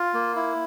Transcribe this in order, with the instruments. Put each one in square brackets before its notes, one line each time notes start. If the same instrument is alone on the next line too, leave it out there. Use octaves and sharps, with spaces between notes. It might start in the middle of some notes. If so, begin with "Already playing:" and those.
Already playing: [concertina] F4
A#3
E4